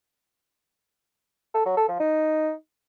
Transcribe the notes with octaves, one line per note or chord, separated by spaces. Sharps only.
A4
F#3
A4
F3
D#4